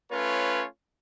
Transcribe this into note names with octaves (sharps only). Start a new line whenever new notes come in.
A3 C#4 F4 B4 C#5